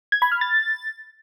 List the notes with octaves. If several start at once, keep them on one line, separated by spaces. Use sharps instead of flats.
G#6
B5
F6
A6